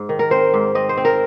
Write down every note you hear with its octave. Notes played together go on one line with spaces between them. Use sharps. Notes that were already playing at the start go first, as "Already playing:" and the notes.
Already playing: G#2
D#3
A#4
C4 C5
G#2
C4 D#5
C5
C4
A#4